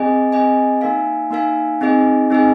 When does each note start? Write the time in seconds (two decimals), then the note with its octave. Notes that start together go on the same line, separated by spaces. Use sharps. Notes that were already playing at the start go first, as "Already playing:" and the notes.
Already playing: C4 G#4 D#5 G#5
0.32 C4 G#4 D#5 G#5
0.81 A#3 D#4 A#4 F5 G#5
1.31 A#3 D#4 A#4 F5 G#5
1.81 C4 D#4 G#4 D#5 G#5
2.30 C4 D#4 G#4 D#5 G#5